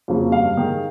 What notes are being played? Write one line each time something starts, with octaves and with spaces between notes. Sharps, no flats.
F2 C#3 F#3 A#3
G2 F5
D#3 G#3